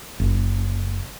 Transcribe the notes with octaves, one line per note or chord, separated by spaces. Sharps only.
F#1